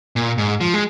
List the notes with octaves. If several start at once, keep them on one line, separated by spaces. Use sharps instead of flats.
A#2
G#2
F3
G#3